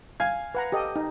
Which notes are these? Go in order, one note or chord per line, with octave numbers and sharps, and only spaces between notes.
F5 G#5 G#6
B4 F#5 A#5
G4 A4 D#5
D#4